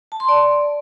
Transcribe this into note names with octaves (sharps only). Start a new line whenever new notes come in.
A5
C6
D5